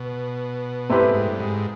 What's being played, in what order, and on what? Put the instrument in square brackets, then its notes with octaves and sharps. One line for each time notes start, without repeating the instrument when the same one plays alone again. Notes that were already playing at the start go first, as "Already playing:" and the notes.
Already playing: [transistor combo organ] B2
[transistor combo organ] G2 [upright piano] A3 C4 E4 G4 B4
[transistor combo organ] G#2
G#2
G2
G#2